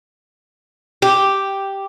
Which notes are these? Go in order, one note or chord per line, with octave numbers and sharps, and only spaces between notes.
G4